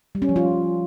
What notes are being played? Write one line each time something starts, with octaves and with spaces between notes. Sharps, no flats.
G3
C#4
F3
F4